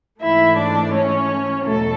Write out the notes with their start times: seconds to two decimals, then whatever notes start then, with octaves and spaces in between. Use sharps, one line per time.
0.21 G#2 E3 A3 E4 E5
0.57 D4 D5
0.93 C#4 C#5
1.65 E2 B2 F#3 A3 A4